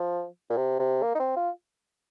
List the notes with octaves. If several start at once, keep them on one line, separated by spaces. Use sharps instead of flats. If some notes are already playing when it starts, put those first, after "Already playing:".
Already playing: F3
A#2
C3
C3
A#3
D#4
C4
F4